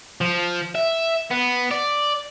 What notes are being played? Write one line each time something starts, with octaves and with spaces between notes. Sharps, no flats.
F3
E5
B3
D5